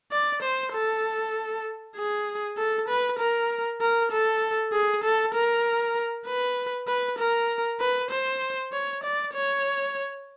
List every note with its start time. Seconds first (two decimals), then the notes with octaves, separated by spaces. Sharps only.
0.12 D5
0.42 C5
0.73 A4
1.96 G#4
2.58 A4
2.88 B4
3.19 A#4
3.81 A#4
4.12 A4
4.73 G#4
5.04 A4
5.34 A#4
6.26 B4
6.88 B4
7.19 A#4
7.80 B4
8.11 C5
8.72 C#5
9.04 D5
9.34 C#5